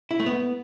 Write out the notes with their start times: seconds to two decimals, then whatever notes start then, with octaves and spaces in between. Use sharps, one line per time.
0.11 E4
0.20 A3
0.26 B3